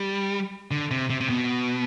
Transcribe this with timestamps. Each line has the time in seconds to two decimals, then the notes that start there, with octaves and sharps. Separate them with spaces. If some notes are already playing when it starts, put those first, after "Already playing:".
Already playing: G3
0.71 D3
0.91 C3
1.10 C3
1.20 C3
1.29 B2